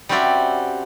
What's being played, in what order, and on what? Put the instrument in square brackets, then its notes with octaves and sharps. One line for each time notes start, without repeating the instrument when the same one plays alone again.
[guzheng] G3 C4 C#4 F#4 D5 E5